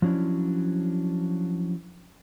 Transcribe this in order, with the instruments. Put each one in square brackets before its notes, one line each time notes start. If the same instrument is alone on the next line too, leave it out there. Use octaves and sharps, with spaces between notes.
[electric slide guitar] F3 F#3 C#4 D4 E4